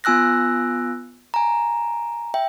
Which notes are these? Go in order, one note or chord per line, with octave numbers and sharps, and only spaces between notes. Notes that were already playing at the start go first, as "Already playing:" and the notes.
B3 F4 G#5 E6 F#6 A#6
G#5 A#5
E5 G5